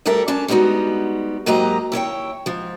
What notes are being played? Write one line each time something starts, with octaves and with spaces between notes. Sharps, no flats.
D2 A2 G3 A4 A#4 E5
C#4 D4 A5
G3 G#3 B3 D#4 F#4
G#2 F#3 A#3 G4 D#5 A#5
D#2 E4 C#5 G5
G#2 F3